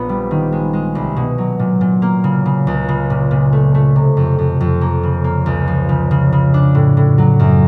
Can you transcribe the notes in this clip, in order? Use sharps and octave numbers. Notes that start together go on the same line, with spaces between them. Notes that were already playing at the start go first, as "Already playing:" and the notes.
Already playing: A#1 B3
G3
D#3
G#3
G#3
C2
B2
F#3
A#2
A#2
A#3
C#3
C#3
C#2
C#3
A#2
A#2
A3
A3
C3
F2
F2
F2
A#3
C#3
A#3
C#2
F3
C#3
C#3
C#3
D4
A2
A2
F#3
F#2